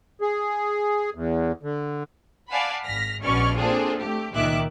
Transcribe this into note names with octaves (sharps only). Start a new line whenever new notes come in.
G#4
E2
D3
D5 F5 F#5 G#5 A5 B5
G#1 F6 A#6 B6
A#1 B2 C#4 D5 C#6 F6
A#3 C4 D4 F4 G#4 A4
A3 G4
C#2 A#2 D#3 E5 D6 F#6